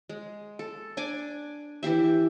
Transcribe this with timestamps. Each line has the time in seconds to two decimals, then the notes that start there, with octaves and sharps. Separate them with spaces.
0.09 G#3
0.59 A4
0.97 D4 D5 G#5 D6
1.83 E3 E4 G4 E5